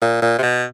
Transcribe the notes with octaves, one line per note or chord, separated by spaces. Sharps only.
A#2
A#2
C3
B2